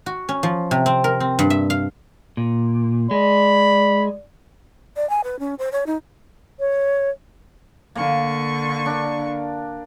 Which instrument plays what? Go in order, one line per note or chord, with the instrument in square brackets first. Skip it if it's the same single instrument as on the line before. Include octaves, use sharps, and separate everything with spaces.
[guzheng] F#4
C#4
F3
C3
C4
A#4
C4
G2
E5
F5
[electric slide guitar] A#2
[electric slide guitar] G#3 [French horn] D5 [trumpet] B5
[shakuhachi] D5
G#5
B4
C#4
C5
C#5
D#4
[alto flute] C#5
[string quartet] D3 C#6 [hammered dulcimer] A#3
[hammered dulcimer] D4 A#4